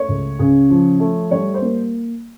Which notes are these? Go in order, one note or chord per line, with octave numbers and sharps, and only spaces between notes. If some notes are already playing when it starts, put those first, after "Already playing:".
Already playing: A3 C#5
C#2
C#3
F3
A3
G3 C#5
C5
A#3